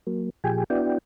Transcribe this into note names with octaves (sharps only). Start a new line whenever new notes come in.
F#3 A#3
A#2 F3 G4 G#4 G5 G#5
B3 D4 E4 F#4 D5 G5